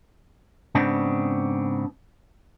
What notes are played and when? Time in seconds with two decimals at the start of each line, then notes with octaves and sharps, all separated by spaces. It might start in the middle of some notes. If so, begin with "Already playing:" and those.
0.75 G#2 C#3 B3 C4 D4